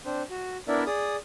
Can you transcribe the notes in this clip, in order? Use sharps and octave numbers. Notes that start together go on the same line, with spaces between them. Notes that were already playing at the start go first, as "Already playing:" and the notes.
C4 D4 C5
F#4
B3 D4 E4 A#4 D5 E5
G#4 D5 D#6